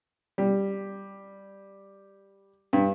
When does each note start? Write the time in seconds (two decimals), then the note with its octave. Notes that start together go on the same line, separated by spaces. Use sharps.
0.38 G3
2.73 G2